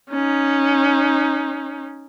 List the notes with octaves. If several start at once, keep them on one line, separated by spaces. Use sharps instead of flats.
C#4 D#4